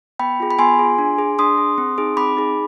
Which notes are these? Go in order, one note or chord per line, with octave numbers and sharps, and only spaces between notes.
B3 G5 B5
F4 G#4
B5
B3 G#5 C6
F4 G#4
D4
G#4
D4 C6 D#6
G#4
C4
D#4 G#4
C4 B5 D6
D#4 G#4